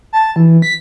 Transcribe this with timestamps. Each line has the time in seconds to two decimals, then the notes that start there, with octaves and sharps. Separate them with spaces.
0.13 A5
0.36 E3
0.62 B6